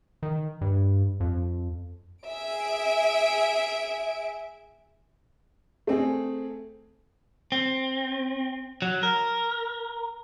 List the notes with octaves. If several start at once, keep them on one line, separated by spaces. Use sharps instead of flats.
D#3
G2
F2
G#4 E5 D7
A3 C4 G#4
C4
F#3
A#4